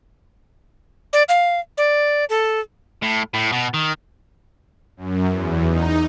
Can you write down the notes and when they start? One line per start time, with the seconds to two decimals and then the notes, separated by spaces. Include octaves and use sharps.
1.13 D5
1.29 F5
1.77 D5
2.29 A4
3.03 A2
3.34 A2
3.52 B2
3.74 D#3
4.97 F#2
5.29 E2
5.69 D#4